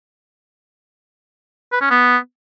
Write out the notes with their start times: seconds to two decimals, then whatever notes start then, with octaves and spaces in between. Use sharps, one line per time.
1.72 B4
1.81 C#4
1.90 B3